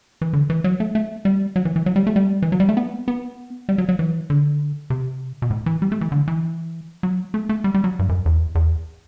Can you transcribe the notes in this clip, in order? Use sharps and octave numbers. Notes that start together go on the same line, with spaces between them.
E3
D3
E3
F#3
A3
A3
G3
F#3
E3
E3
F#3
G3
A3
G3
E3
F#3
G3
A3
B3
B3
G3
F#3
F#3
E3
D3
C3
B2
A2
E3
G3
A3
E3
D3
E3
F#3
A3
A3
G3
G3
F#3
G2
F#2
E2
E2